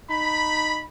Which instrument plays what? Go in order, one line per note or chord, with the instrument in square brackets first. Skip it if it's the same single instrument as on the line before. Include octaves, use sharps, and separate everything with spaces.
[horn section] D#4 B5